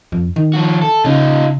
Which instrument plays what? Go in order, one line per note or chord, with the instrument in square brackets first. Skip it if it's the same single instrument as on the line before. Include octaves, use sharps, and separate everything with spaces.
[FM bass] F2
D#3
[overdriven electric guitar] F3 F#4
A4
[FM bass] C#3 [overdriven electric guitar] D#4 F4